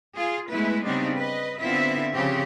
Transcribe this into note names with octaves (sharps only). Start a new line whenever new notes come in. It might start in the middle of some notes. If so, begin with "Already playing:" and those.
F4 G#4
G#3 A3 B3 E4 B4
C#3 G3 B3 C4 D4 D#4
B4 D#5
D3 B3 C4 E4 F4 E5
C#3 F3 C4 G4